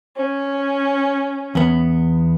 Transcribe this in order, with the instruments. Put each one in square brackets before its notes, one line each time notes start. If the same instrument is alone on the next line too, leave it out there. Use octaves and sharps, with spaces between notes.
[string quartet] C#4
[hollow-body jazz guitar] E2 B3